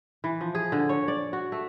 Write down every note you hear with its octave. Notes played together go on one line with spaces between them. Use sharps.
E3
F3
G#4
D3
C#5
D5
F#4
A3